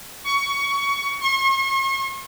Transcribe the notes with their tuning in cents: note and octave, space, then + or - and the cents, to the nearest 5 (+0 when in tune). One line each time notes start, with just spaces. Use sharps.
C#6 +20
C#6 -45